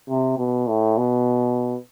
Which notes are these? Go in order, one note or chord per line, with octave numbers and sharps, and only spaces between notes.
C3
B2
A2
B2